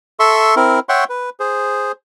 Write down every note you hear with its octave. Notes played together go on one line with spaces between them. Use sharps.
A4 E5 C6 C#6
C4 E4 A#4
C#5 E5 F#5 G5 C6 C#6
B4
G#4 C5